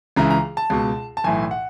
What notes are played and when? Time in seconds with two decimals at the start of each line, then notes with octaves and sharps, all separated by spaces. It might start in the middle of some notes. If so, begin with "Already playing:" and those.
0.16 C#2 C#3 E3 A#5
0.30 A#5
0.57 A5
0.70 C#2 B2
1.17 A5
1.24 B1 A2 E3 G#5
1.51 F#5